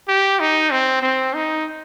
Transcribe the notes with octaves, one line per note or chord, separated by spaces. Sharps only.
G4
D#4
C4
C4
D#4